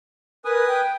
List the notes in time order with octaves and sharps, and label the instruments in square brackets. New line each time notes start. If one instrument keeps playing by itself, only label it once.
[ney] A#4 [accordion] B4 G#5 D#6
[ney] G5